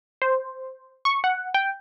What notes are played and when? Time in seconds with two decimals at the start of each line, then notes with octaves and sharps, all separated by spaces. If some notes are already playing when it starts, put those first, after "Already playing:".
0.22 C5
1.05 C#6
1.24 F#5
1.54 G5